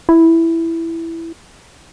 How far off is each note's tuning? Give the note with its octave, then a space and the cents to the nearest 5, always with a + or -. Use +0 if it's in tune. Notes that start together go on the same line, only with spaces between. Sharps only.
E4 +5